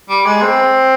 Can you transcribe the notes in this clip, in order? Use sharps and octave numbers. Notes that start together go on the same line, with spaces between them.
G3
G#3
C4